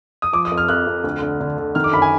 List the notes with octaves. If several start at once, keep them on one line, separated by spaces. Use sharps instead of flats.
D#6
F3 D6
D#6
F2
F6
F2 F#6
F2
D2
D3
D3
D3
D#3 F6
D6
F#2 B5
G#5